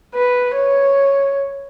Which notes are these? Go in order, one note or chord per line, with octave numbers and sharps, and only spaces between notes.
B4
C#5